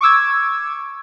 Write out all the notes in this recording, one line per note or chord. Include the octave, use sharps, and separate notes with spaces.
C#6 D6 E6 G#6